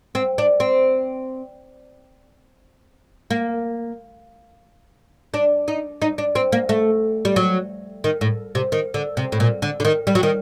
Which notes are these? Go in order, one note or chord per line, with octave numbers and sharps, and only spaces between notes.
C4
D4
C4
A#3
D4
D#4
D#4
D4
C4
A#3
A3
G3
F#3
D#3
A2
C3
D#3
D3
C3
A2
A#2
D3
D3
D#3
G3
F#3
D#3